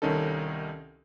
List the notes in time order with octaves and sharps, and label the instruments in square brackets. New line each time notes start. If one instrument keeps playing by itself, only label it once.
[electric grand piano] C2 D#3 C#4 D#4 A4